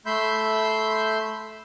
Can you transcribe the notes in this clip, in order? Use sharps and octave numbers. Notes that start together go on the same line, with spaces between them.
A3 E5 B5 C6 G6